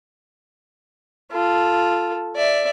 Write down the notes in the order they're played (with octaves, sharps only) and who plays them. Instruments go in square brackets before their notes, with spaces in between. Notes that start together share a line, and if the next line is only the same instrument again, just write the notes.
[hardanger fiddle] F4 A4
D5 E5